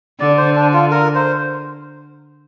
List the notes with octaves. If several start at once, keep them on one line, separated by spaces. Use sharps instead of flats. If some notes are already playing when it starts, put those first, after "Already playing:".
D3 D5
C5
D4
F4
A#4
C5